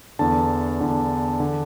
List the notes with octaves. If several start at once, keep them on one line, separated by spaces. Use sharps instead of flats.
E2 D3 A5
E2 D3
D3